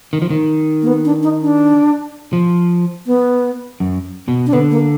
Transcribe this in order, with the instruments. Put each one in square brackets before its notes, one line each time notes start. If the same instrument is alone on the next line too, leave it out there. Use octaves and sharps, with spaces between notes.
[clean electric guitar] D#3
F3
D#3
[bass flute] A#3
B3
D4
D#4
D4
[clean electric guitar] F3
[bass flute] B3
[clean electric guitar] F#2
B2
[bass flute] D4
[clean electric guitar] D3 [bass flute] B3
[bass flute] A#3